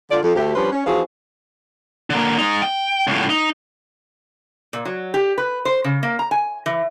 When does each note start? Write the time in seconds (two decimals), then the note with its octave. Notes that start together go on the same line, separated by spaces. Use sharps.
0.11 D3 F4 D5
0.23 F2
0.36 D2 A3 G4
0.56 G2 F3 G3 C#4 B4 C5
0.72 C#4
0.86 E3 F3 C4 F#4 G#4 F5
2.10 D3 A#3
2.38 G#3 D#4
2.62 G5
3.07 C#2 A2
3.30 D#4
4.73 A#2
4.85 F#3
5.14 G4
5.38 B4
5.65 C5
5.84 C#3
6.03 A#3
6.19 A#5
6.31 G#5
6.66 E3